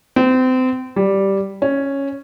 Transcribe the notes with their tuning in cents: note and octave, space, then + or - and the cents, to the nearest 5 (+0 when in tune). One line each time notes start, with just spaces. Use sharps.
C4 -30
G3 -5
C#4 -5